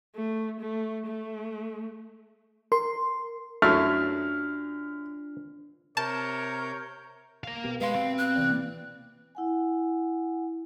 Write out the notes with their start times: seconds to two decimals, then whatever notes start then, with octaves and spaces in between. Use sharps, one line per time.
0.16 A3
0.61 A3
1.06 A3
2.72 A#4 C6
3.62 F#2 F#3 A3 D4 E4 F4 F6
5.97 C3 A#4 C#5 A5 G6
7.44 A#4 F5
7.64 B2 B3 G4
7.81 G#3 B4 F5 C6
7.95 C4
8.18 F#6
8.36 C3 E3 D5
9.35 E4 F#5 G#5